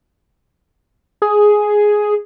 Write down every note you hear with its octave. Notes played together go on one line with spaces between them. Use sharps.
G#4